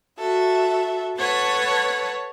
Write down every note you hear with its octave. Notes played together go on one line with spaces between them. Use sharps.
F#4 A4 E5
A4 B4 C#5 F#5 A5